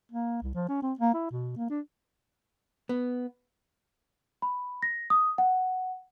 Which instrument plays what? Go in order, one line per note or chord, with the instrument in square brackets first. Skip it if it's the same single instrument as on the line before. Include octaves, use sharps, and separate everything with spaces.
[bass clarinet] A#3
C2
F3
C#4
C4
A#3
E4
B2
A#3
D4
[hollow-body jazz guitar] B3
[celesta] B5
A#6
D#6
F#5